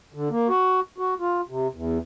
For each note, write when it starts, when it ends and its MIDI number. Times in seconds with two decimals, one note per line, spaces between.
0.14 0.29 50
0.30 0.48 58
0.49 0.80 66
0.98 1.14 66
1.20 1.41 65
1.49 1.67 48
1.75 1.98 40